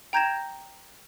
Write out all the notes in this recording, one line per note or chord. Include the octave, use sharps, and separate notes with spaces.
G5 A#5 G6 G#6 A#6 E7